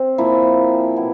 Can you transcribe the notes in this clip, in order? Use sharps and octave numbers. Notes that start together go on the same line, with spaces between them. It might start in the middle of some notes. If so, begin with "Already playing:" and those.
Already playing: C4
A#2 F3 A#3 E4
B2 F#3 B3 E4